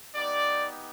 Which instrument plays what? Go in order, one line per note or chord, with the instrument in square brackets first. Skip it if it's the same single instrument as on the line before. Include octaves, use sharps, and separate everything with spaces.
[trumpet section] B3 D#4 G4 D5